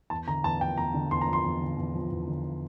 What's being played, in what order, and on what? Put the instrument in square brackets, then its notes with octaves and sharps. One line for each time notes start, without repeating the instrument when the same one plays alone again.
[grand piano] E2 A5
D3 A#5
E2 A5
F3 G5
E2 A#5
D3
E2 C6
A#5
F3
C6
E2
D3
E2
F3
E2
D3